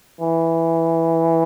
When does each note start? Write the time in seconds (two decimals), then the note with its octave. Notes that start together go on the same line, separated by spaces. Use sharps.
0.21 E3